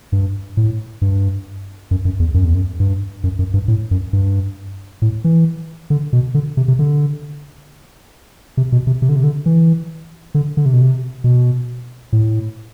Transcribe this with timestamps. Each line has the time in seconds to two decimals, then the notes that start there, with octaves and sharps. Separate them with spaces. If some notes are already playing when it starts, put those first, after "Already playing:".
0.12 G2
0.57 A2
1.02 G2
1.91 F#2
2.05 F#2
2.20 E2
2.34 F#2
2.45 E2
2.54 F#2
2.80 G2
3.24 F#2
3.39 F#2
3.54 G2
3.68 A2
3.91 F#2
4.13 G2
5.02 A2
5.24 E3
5.90 D3
6.13 B2
6.34 D3
6.57 C3
6.68 C3
6.79 D3
8.57 C3
8.72 B2
8.87 C3
9.02 C3
9.09 D3
9.16 C3
9.24 D3
9.46 E3
10.34 D3
10.57 D3
10.66 C3
10.73 B2
10.81 C3
11.24 B2
12.13 A2